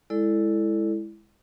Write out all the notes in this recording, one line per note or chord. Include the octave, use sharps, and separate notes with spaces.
G#3 E4 A4 D5